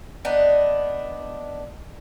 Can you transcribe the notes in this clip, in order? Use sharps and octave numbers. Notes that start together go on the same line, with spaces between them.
B3 D4 D#4